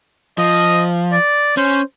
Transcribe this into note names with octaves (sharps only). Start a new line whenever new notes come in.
F3 D#5
D5
C#4 C5